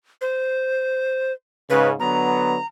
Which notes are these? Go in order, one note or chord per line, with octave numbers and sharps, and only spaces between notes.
C5
G#2 C#3 B4
D3 F#3 B3 A#5